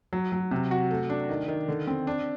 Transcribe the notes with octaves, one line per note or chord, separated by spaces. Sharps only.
F#3
F#3
C3
F#4
A3
D4
D#3
D#3
D3
C4
D4